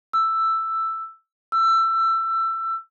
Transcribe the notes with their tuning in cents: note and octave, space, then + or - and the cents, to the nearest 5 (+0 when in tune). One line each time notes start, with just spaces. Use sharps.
E6 +5
E6 +20